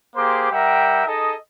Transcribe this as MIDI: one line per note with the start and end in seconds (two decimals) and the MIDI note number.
0.16 0.48 58
0.16 0.48 67
0.16 0.48 68
0.16 0.48 72
0.16 0.48 84
0.16 0.48 86
0.51 1.04 55
0.51 1.04 70
0.51 1.04 76
0.51 1.04 78
0.51 1.04 79
1.06 1.34 63
1.06 1.34 68
1.06 1.34 69
1.06 1.34 75